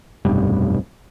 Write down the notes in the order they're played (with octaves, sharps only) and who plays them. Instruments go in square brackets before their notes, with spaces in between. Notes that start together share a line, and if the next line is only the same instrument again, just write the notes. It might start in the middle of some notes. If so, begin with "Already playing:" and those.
[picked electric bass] F1 B1 G2